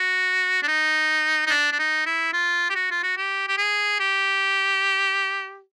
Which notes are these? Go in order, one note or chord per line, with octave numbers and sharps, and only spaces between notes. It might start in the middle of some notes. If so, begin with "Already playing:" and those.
Already playing: F#4
D4
D#4
D#4
D4
D4
D#4
E4
F4
G4
F#4
F4
F#4
G4
G4
G#4
G4